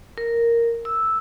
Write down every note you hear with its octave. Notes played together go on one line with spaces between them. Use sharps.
A#4
E6